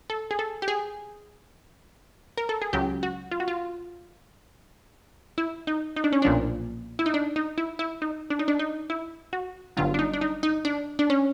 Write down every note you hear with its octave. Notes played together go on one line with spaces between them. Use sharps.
A4
G#4
A4
G4
G#4
A#4
A4
G#4
C#2 C#3 F#3 G4
F#4
F4
F#4
F4
E4
D#4
D#4
D4
C#4
B1 A#2 F3 D4
E4
D#4
D4
D#4
E4
E4
D#4
D4
D#4
D4
D#4
E4
F#4
G1 G2 D3 F#3 F4
D4
D#4
D4
D#4
D#4
D4
D4
C#4